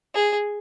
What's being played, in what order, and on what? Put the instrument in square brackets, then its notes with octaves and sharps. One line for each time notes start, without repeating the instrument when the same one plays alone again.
[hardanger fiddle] G#4